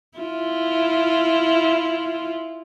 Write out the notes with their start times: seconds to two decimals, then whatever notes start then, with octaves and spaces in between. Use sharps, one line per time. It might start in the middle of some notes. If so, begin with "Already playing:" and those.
0.18 E4 F4